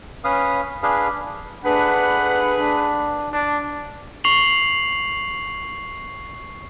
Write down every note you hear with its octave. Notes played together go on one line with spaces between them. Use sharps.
C#4 B4 F5 D#6
D4 G#4 B4 F5
A3 D4 G#4 B4 F#5
D4
D4
C#6 C7 F7 F#7